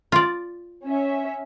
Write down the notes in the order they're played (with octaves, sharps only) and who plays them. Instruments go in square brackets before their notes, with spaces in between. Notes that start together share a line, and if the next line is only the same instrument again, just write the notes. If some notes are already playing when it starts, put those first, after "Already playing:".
[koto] F4 D5
[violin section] C#4 E5